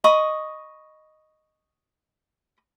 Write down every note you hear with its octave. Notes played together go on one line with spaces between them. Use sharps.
D#5 B5 C#6 D#6